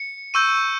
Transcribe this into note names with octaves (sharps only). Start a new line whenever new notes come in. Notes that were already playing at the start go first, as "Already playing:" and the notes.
Already playing: C#7
C#6 E6 G6 D#7